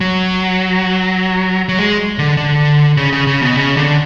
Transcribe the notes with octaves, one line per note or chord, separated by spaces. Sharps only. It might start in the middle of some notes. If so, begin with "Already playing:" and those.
F#3
F#3
G#3
D3
D3
C#3
C#3
C#3
B2
C#3
D3